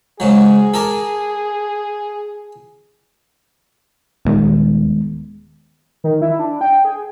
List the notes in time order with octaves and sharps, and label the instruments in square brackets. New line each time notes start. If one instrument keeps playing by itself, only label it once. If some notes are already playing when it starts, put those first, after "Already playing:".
[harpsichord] G#2 C#3 F#3 [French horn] G#4
[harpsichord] A4 A#4 D5
[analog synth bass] D#1 [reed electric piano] D#3 G#3 B3
[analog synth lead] D#3
E4
D4
G5
G#4